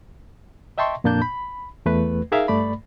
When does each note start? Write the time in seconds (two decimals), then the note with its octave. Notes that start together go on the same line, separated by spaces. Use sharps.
0.78 D#5 E5 G5 A5 C6 C#6
1.04 F2 A#2 A#3 D4 A5 G6
1.22 B5
1.86 E2 A3 B4
2.32 D#4 G#4 A#4 E5 F5
2.48 G2 A3 D5 B5